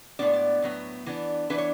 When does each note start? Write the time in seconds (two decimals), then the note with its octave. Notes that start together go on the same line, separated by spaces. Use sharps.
0.19 A2 G#3 B3 D4 D5
0.27 C#5
0.34 D5
0.62 A2 F#3 B3
1.06 E3 B3 D4
1.50 E3 B3 D4 B4
1.58 C#5